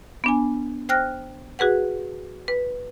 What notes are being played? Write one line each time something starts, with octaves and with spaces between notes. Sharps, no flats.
B3 D4 G#5
C5 G5 F6 F#6 A#6
F#4 G#4 B4 F#5
B4